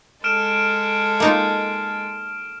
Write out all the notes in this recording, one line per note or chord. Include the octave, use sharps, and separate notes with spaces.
G#3 A4 F6 D7 E7
A#3 D#4 F4